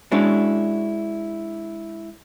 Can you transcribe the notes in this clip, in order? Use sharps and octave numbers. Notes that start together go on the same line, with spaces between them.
G#3 C#4 D4 E4 F#4